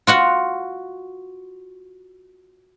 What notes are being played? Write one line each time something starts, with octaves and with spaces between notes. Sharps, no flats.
F4 F#4 F#5